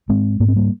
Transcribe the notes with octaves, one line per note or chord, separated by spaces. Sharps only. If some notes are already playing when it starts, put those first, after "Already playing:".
G#2 G#3 C4
G#2 A#3
C4
G3 A#3